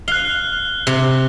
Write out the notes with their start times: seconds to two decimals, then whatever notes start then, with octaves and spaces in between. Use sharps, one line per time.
0.08 F5 F#6 G7
0.87 C3